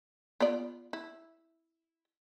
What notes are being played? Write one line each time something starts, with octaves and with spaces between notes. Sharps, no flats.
B3 F4 D5
E4